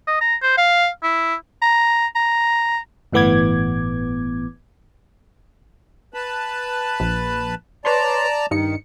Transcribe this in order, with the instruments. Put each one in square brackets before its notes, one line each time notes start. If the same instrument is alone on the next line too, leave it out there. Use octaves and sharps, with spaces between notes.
[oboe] D#5
A#5
C5
F5
E4
[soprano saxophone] A#5
A#5
[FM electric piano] G1 A2 E3 B3 D6 G#6
[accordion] B4 A5 B5
[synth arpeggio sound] A#1
[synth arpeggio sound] B4 C#5 C6 [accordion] D5 A5 A#5
[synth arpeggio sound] G2 D#4 C#7 [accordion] D#3